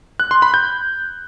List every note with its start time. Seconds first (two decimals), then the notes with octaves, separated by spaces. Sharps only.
0.20 F#6
0.31 C6
0.42 B5
0.54 G6